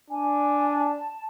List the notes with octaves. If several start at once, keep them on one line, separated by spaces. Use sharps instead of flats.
D4 G#5
A5